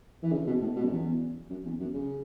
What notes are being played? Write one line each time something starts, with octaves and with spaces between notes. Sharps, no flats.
E3
C#3
B2
A2
B2
F#2
E2
F#2
E2
F#2
C#3